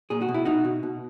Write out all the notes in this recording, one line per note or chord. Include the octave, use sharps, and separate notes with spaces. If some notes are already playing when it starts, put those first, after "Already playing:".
A#2 G#4
F#4
B2
E4
B2 D#4 F#4
B2
B2